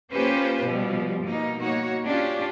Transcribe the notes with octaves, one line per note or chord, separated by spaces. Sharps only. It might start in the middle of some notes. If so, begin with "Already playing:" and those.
A#3 C#4 F4 G4 B4 C5
B2 F3 G3
B2 A#3 D#4
A#3 D#4 F#4 C#5
C#4 D4 F4 G4